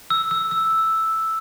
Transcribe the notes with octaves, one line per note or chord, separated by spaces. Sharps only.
E6
E6
E6